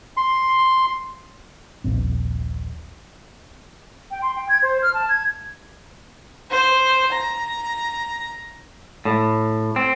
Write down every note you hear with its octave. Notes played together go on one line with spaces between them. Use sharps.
C6
D#1 A#1 C4
G5
C6
G5
G#6
C5
F6
A5
G#6
C5
A#5
A2
C4